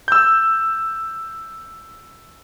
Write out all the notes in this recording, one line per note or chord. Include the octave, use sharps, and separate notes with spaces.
E6 G6